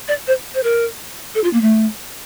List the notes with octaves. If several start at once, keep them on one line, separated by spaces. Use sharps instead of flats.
D5
C5
C5
A#4
A4
F4
A#3
A3